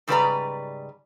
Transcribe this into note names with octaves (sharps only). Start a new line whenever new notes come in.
G#2 C#3 G3 B4 D5 A#5